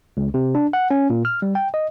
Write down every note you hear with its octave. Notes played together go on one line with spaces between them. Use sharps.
C#2
C3
D4
F#5
C#4
A#2
F6
G3
G5
D#5